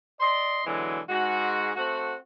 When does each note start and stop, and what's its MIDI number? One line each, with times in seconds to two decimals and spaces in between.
0.20 0.62 74
0.20 0.62 75
0.20 0.62 84
0.65 1.00 47
0.65 1.00 50
0.65 1.00 52
0.65 1.00 54
0.65 1.00 56
1.08 1.70 44
1.08 1.70 56
1.08 1.70 66
1.76 2.14 57
1.76 2.14 60
1.76 2.14 66